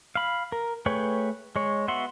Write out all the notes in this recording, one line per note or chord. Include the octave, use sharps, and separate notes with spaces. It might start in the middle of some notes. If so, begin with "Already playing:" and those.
F5 B5
A#4
A3 G#4 B4 C#5 G5
G#3 C#5
B3 F#4 E5 F#5 C6